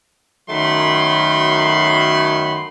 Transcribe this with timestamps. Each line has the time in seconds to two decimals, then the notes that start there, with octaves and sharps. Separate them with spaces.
0.49 F#2 D#3 F#3 A3 B5 C6